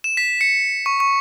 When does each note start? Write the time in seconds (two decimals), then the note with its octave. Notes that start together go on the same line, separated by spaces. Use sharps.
0.04 E7
0.17 B6
0.41 C#7
0.86 C#6
1.00 C#6